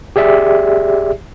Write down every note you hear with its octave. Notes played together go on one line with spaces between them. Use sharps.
G4 G#4 D5 E5